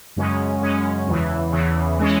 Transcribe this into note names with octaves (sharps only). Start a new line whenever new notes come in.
F#2 C#3 G#3 C#4
F#2 C#3 G#3 C#4
E2 C#3 E3
E2 C#3 E3
E3 G#3 C#4